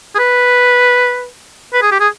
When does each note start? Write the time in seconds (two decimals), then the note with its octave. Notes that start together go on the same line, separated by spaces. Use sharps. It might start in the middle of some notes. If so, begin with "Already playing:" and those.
0.15 G#4
0.19 B4
1.73 B4
1.82 G#4
1.92 G4
2.00 G#4